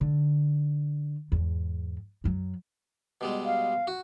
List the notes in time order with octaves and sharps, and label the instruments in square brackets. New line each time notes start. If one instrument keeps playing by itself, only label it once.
[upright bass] D3
E2 G#2
F#2 F#3
[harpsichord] B2 G3 G#3
[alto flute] F5
[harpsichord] F#4